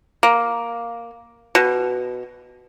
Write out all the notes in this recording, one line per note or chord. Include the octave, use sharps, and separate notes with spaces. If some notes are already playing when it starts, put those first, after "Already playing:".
A#3
B2